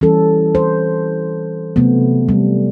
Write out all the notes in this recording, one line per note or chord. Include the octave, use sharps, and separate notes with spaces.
E3 G3 C#4 A4
C5
C3 F#3 A3 B3
G3